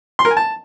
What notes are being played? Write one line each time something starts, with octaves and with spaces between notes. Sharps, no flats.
C6
A#4
G#5
A5